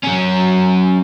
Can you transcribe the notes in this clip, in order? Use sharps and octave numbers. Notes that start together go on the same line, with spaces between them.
F#3 C#4